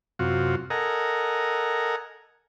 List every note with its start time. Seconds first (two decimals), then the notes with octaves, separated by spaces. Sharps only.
0.19 F#2 C3 F4 F#4
0.70 A4 A#4 D#5 F#5 G#5 A#5